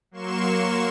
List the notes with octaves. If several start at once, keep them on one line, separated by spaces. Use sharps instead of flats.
F#3 A#3 C6 C#6 E7